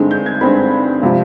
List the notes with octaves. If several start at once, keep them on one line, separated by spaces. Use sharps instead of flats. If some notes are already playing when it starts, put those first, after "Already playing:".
Already playing: G2 D3 G#3 C4 D#4
G6
G#6
G2 D3 G#3 C4 D#4 B5
C3 F3 F5